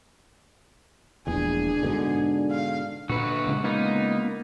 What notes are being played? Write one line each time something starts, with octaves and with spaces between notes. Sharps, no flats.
E1 A#1 E2 D4 G#4
G#2 B2 D3
F5
A#2 D3 F#4 B4
C#3 G#3 C#4
A#3 B3 D#4 F4